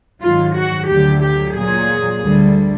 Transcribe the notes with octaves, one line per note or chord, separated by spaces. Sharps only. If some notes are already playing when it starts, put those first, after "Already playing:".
G#2 D#3 F#3 F4
F#4
D2 D3 F#3 G4
G4
A#2 F#3 G#4
D2 D3 G3